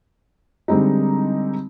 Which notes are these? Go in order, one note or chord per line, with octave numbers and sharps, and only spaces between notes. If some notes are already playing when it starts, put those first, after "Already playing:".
D3 G3 G#3 C4 D#4